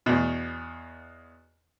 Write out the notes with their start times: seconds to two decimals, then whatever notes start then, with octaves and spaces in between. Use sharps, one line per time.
0.06 E2 B2